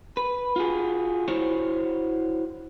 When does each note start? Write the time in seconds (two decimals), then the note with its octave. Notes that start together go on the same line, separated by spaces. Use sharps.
0.17 B4
0.56 F4 F#4 G#4
1.28 E4 F#4 C5 C#5